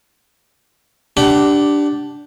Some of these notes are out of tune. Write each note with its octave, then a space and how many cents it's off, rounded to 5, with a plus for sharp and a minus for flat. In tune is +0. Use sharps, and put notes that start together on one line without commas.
D4 -5 G4 +0 F#5 +30